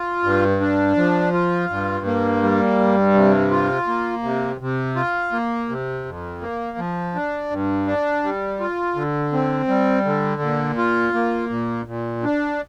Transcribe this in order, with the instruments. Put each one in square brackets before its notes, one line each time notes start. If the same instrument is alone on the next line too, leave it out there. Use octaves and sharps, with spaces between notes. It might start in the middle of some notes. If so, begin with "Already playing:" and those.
Already playing: [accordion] F4
G2
D4
F3
F4
G2
A#3
G3
G2
C3
F4
A#3
C3
C3
F4
A#3
C3
F2
A#3
F3
D4
G2
D4
G3
F4
D3
C4
G3
D3
A#2
F4
A#3
A#2
A#2
D4